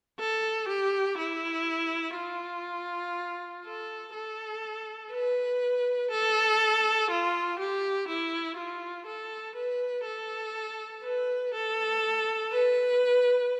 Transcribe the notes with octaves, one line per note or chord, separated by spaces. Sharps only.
A4
G4
E4
F4
A4
A4
B4
A4
F4
G4
E4
F4
A4
B4
A4
B4
A4
B4